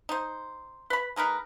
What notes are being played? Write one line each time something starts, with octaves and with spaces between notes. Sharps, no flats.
D#4 C5
B4 B5
G#3 D#4 A#4 B4